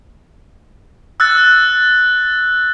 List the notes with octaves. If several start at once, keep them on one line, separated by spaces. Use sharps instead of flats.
E6 F#6 A6